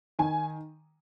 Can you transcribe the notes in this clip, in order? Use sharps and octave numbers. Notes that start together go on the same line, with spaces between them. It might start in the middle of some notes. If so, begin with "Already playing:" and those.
D#3 G#5